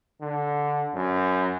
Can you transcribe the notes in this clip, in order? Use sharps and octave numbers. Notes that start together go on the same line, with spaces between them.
D3
F#2